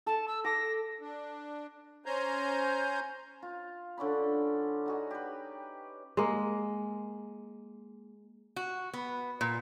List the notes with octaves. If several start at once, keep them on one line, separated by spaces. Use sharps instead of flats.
A4 A5
E6
A4 D6 A#6
D4
C#4 C5 G#5 A#5 G6
F4
D3 C#4 D4 B5
D#4 F#4 G#4
G4 B4
G#3 A#3
F#4
B3
A#2